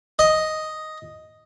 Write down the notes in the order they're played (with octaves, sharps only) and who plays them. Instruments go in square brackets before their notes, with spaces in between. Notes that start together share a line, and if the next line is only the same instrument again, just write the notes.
[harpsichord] D#5